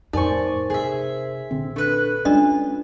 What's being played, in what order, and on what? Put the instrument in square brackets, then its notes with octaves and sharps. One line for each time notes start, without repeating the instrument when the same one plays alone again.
[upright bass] F2 A2 [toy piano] D#4 [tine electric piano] A#4 C5 [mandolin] D5 G#5 C#6
[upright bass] C3 [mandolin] G#4 E5
[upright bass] A#1 [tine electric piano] D3 C4
[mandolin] A3 B4 F#6 [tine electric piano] D4
[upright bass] G#3 [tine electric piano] C#4 F4 [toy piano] D4 D5 D#5